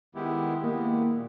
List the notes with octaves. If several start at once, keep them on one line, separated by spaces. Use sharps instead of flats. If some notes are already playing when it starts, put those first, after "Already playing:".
D#3 G#3 B3 E4 G4
D#3 G#3 A#3 B3 E4 G4
A#2